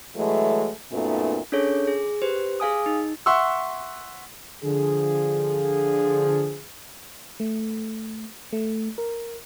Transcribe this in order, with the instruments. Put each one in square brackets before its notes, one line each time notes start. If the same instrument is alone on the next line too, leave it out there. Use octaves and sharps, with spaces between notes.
[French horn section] E3 F#3 G#3 A3
F#2 A#2 A3 B3 D#4
[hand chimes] C#4 D4 G#4 A4 C#5
G#4
G4 B4 C5
G#4 F5 G#5 D#6
D#4
[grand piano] E5 F#5 C6 C#6 E6
[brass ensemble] D3 F3 G#4
[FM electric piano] A3
A3
A#4